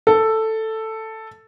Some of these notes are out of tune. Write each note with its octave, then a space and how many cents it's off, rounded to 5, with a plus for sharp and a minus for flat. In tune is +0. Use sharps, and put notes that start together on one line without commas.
A4 +5